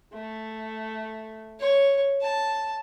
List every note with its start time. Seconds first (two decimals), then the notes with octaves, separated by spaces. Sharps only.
0.13 A3
1.60 C#5
2.22 A5